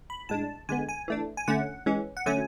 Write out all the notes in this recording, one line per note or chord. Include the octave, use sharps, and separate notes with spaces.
B5
A2 G#3 D4 A5
D3 G#3 B3 G#5
G#5
E3 A3 D4
G#5
D3 A3 C#4 F#5
E3 G#3 C#4
F#5
D3 F#3 A3 C#4 G#5